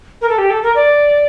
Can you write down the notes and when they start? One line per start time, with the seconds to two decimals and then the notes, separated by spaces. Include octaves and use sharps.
0.21 A#4
0.29 A4
0.38 G4
0.50 A4
0.63 A#4
0.75 D5